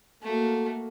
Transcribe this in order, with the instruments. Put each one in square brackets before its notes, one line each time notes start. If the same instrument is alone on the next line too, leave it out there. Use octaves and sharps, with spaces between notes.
[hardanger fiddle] A3 [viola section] A#3 F#4